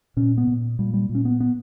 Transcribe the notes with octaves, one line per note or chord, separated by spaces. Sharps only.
A#2 C#4
B3
A#2
A#2 G3
G3
A#2
C#4
B3
B3